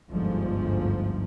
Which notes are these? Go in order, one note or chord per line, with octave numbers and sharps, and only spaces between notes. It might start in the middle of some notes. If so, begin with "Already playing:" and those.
G1 D2 G#2 F3